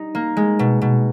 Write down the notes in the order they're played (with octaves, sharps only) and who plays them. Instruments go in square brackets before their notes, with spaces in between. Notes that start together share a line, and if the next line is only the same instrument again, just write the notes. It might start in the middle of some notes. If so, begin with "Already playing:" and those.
Already playing: [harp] G3 D#4
A#3
G#3
B2
B2